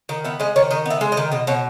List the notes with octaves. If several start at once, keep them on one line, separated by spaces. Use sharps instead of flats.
D#3 D#5
B3 E5
G#3 D#5
D#3 C#5
D#3 D#5
B3 E5
G#3
D#5
D#3
B2 D#5
B2 C#5